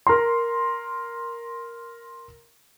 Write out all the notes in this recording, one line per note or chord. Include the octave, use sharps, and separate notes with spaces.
A#4 A#5 C6